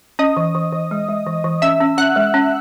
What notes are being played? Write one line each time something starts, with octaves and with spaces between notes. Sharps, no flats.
C#4 D#5 D#6
E3
E3
E3
G#3
G#3
E3
E3
C#4 E5 E6
C#4
C#4 F#5 F#6
G#3
C#4